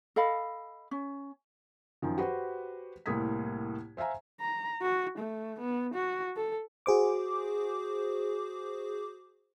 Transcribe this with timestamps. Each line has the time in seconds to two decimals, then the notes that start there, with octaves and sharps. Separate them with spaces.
0.16 A4 D#5 F5 B5
0.91 C#4
2.02 F#2 D#3 F3
2.18 F#4 G4 B4 C5
3.06 C2 A2 A#3 D#6 G#6 B6
3.97 C5 E5 F5 G#5 A#5
4.40 A#5
4.82 F#4
5.18 A3
5.59 B3
5.94 F#4
6.36 A4
6.86 F#4 G#4 C5 D6